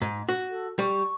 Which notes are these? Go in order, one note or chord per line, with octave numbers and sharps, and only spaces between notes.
G#2
F#4
A4
G3 C#6